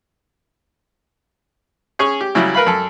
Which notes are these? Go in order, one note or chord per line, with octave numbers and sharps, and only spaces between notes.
C#4 G#4 C#5 C#6
G4
C#3 F#3 G3 E4
A#4 B4 F5 B5
F#2 A4